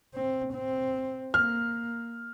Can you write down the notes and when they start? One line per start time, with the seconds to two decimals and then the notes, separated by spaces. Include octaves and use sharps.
0.14 C4
0.53 C4
1.34 A#3 F6